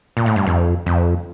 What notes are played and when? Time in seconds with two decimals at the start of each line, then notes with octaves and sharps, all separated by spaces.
0.17 A#2
0.26 A2
0.36 G2
0.47 F2
0.86 F2